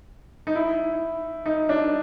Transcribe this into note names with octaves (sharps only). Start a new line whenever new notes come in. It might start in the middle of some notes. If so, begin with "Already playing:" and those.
D#4
E4
D#4
D4